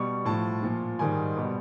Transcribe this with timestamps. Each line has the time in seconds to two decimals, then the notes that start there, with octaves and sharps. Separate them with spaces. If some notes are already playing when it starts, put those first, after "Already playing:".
Already playing: B2 G3 C#6
0.25 A2 F3 A5
0.63 A#2 F3
0.99 G#2 D#3 G3 G#5
1.37 B2 G3